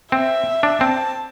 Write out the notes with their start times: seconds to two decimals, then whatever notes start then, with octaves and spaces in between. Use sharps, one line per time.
0.12 C4 E5
0.63 D4
0.80 C4 A5